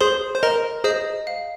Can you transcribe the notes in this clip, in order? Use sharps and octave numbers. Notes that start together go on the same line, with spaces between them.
G#4 C5 C6
C5
A#4 D#5 A#5
G#4 C5 D#5
F5